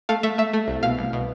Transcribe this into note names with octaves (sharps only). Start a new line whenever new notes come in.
A3 F5
A3 E5
A3 E5
A3
C2
B2 F5
C2
B2